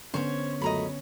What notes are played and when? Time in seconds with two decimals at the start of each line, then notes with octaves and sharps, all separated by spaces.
0.14 D3 B3 C#4 C5 C#5
0.62 C#2 F#2 A3 D#5 A#5 B5